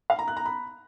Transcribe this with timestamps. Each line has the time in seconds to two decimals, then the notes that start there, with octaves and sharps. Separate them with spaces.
0.10 F5
0.19 A#5
0.28 F#6
0.37 A#5
0.46 B5